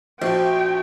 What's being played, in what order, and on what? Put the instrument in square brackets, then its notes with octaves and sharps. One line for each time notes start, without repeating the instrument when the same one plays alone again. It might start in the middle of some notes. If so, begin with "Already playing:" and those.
[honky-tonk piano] A#1 F3 [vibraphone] F#4 [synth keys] C5 C#6 [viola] G5